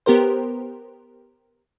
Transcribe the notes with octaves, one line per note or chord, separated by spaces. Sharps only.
B3 G4 A#4 C5